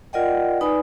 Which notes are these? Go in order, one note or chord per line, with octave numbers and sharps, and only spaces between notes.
F4 A#4 D5 D#5 F#5 G5
D#4 B4 D5 G#5 B5 D#6